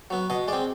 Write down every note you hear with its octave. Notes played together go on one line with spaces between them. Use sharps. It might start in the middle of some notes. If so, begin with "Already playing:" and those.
F#3 B3
B2 D#5
G#3 C4 D5